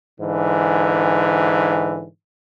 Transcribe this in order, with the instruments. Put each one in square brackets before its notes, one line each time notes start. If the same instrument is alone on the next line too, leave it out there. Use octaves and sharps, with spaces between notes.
[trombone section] G#2 D3 E3